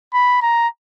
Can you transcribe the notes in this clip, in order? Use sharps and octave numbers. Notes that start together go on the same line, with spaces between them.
B5
A#5